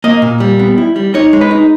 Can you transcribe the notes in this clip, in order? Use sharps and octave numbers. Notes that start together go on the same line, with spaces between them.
A#3 D#5
A#2
G3
B3
E4
G3
D#4 C#5
G#3
B4
D#4